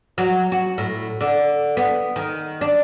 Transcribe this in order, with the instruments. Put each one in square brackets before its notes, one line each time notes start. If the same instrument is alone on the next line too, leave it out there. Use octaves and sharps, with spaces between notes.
[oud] F#3
F#4
A2
D3
B3
D#3
D4